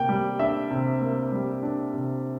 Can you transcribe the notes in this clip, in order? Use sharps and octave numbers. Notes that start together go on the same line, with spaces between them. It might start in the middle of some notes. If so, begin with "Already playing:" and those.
Already playing: C3 A#3 G5
G3
D4 E5
C3
A#3
G3
D4
C3